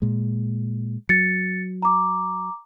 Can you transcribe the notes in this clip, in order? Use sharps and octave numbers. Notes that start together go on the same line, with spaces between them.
A#2 G#3
F#3 A6 C#7
A#5 D6